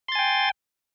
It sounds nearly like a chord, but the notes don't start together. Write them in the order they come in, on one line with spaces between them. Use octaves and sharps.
C6 A6 G#5 G5